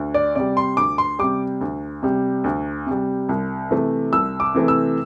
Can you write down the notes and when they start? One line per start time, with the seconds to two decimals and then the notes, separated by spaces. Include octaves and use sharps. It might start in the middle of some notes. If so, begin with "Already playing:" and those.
Already playing: D2
0.14 D5
0.35 C3 G3 D5
0.57 C6
0.77 D2 D6
0.98 C6
1.19 C3 G3 D6
1.61 D2
2.03 C3 G3
2.44 D2
2.86 C3 G3
3.29 C2
3.71 C3 E3 A3
4.13 C2 E6
4.40 D6
4.54 C3 E3 A3
4.68 E6